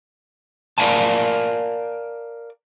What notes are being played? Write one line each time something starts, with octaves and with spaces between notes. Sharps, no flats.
A#4 D5 E5 F5 G#5 A5